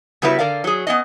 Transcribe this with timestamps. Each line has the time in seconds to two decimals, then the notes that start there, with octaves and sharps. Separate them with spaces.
0.22 C#3 G3 B3 E4 F#4 B4
0.39 D3 A#4 D5 F5
0.64 F#3 G#4
0.87 B3 C#4 D#5